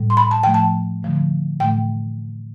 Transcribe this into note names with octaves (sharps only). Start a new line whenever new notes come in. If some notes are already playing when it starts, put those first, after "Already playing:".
Already playing: A2 G3
C6
B5
A5
A2 F3 A3 G5
A5
D3 F3 A3
A2 E3 A3 G5